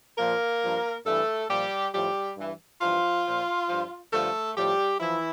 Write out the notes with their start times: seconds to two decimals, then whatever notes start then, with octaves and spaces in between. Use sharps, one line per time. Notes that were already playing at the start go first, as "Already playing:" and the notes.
0.18 A#2 F3 A#3 A#4
0.61 G2 F3
1.05 G2 E3 A3 A4
1.49 A#2 F3 G3 G4
1.93 A2 F3 G3 G4
2.37 G2 E3
2.81 G2 E3 F3 F4
3.25 A#2 F3
3.69 G2 F3
4.13 G2 D3 F3 A3 A4
4.56 A2 F3 G3 G4
5.00 E3 F3 E4